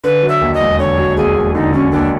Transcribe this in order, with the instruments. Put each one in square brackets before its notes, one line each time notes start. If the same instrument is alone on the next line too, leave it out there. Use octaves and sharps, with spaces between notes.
[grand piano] D3 [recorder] B4
[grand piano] F#3
[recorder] E5
[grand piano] D#2
[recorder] D#5
[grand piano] E1
[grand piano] D3 [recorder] C#5
[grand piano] F#3
[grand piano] D#2 [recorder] G#4
[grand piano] E1
[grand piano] D3 [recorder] D#4
[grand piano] F#3 [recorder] C#4
[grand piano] D#2 [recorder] D4